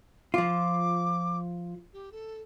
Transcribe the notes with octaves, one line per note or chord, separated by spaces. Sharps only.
F3 F4 D6
G4
A4